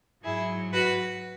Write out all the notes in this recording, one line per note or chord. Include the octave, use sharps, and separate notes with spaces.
G#2 F#3 E4 G#4
F#4 B4